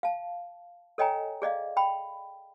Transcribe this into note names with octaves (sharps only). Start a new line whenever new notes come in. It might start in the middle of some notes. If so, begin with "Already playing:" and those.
F5 A5
A4 C#5 D#5 G5 G#5 A#5
G#4 D5 D#5 F5
G5 B5